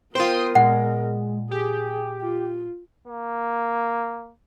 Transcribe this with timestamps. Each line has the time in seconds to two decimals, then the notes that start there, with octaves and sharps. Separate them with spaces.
0.15 B3 F4 A#4 C5 G5 C6 D#6
0.55 A#2 G#3 F#5
1.51 G4 G#4
2.21 F4
3.07 A#3